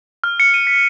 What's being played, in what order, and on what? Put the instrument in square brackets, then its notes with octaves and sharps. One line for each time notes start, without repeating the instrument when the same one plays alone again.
[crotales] F6
C#7
D#7
B6